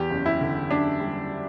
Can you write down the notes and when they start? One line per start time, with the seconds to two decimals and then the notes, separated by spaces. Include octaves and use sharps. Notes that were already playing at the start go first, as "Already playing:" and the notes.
Already playing: E2 G4
0.10 F#1
0.26 E4
0.41 D3
0.70 F#1 D4
1.00 G3